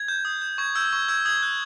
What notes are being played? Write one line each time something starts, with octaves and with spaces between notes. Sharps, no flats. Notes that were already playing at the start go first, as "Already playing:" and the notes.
Already playing: G#6
G6
D#6
G6
C#6 G#6
E6 G6 G#6
C#6 G#6
E6 G6 G#6
D#6 G#6
F#6